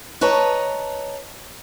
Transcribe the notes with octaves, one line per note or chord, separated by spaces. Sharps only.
B4 C#5 D#5 A5 A#5